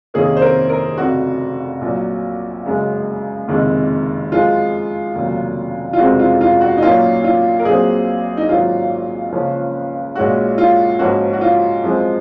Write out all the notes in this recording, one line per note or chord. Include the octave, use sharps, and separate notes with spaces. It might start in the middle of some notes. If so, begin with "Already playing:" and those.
F2 C3 D#3 A#3 C#4 G#4
C5
A#4
A#4
F1 F2 C#3 F#4
A#1 A#2 F#3
F#1 F#2 C#3 G#3
F#1 F2 C3 D#3 G#3
F#2 F3 G#3 F4
F1 D#2 C#3 F#3
F4
F1 F2 C#3 G#3 C4 F#4
F4
F4
F#4
D#4
A#1 A#2 F#3 A#3 C#4 F4
F4
A#4
A#1 A#2 F#3 C4 G#4
D#4
G#1 G#2 F#3 A#3 C#4 F4
C#2 C#3 F3 A#3 C#4
A#1 A#2 G#3 C#4 F#4
F4
G#2 F3 A#3 C#4 F#4
F#4
F4
F#2 F3 G#3 C4